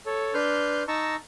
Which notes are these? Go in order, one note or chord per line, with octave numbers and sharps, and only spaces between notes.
A4 C#5
D4 B4 C6 F6 G6
D#4 A5 A#5 C#6 E6